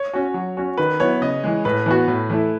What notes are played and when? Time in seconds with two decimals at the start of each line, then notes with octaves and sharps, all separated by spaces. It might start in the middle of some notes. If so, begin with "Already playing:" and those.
Already playing: C#5
0.13 C#4 F#4
0.34 F#3
0.57 C#4 F#4
0.78 D#3 B4
1.00 F#3 B3 E4 C#5
1.22 C#3 D#5
1.44 E3 G#3
1.65 A2 B4
1.86 E3 B3 F#4
2.08 A2
2.30 E3 A3 E4